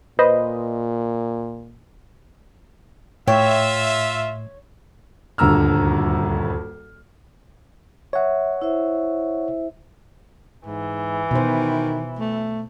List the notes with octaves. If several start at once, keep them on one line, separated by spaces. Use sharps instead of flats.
A#2 B4 C5 D#5
A2 F4 C#5 E5 G5
D#1 D2 G2 A#5 E6 F6
C#5 E5 F#5
E4 C5 E5
G#2 E3
B2 D#3 C5
A3